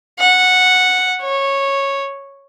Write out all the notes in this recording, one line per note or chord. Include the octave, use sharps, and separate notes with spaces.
F#5
C#5